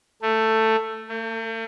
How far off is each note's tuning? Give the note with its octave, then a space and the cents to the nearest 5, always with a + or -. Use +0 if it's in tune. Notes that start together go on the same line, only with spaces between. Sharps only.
A3 +10
A3 +45